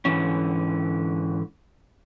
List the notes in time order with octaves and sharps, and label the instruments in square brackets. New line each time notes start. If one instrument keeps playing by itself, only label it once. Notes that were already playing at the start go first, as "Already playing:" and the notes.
[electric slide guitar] G#2 D3 E3 C#4